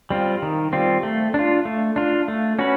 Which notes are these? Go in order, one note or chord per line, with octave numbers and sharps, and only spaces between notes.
G3 C4 F4
D#3
G3 C4 F4
A3
D4 F4
A3
D4 F4
A3
C#4 F#4 B4